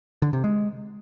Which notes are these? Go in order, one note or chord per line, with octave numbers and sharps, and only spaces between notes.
D3
C3
G#3